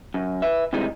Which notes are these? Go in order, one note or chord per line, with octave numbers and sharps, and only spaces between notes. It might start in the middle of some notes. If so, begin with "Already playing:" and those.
F#2
B4 E5
C3 E3 G3 G#3 D#4